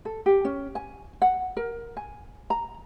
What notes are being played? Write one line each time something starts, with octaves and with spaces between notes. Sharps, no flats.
A4
G4
C#4
G#5
F#5
A#4
G#5
A#5